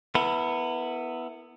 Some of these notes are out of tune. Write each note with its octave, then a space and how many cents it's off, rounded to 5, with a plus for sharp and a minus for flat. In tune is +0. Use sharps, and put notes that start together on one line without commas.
B3 +0 E4 +0 A#4 -45